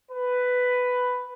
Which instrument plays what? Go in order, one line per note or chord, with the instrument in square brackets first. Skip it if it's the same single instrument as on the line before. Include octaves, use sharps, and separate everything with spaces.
[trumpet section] B4